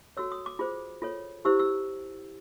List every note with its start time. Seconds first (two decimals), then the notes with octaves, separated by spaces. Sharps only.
0.17 F#4 A4 C#5 E6
0.32 D#6
0.46 D6
0.59 F4 G#4 C5
1.02 F4 A4 C#5
1.45 E4 G4 C5 E6
1.59 E6